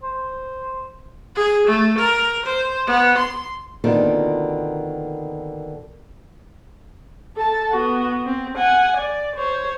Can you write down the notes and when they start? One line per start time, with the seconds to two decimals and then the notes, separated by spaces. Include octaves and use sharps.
0.03 C5
1.36 G#4
1.67 A3
1.98 A#4
2.46 C5
2.87 B3
3.18 C6
3.84 B2 D3 D#3 A#3 C4 F4
7.36 A4 A5
7.71 B3 F#4
8.26 C4
8.57 F#5 G#5
8.98 D5
9.36 C5 C#5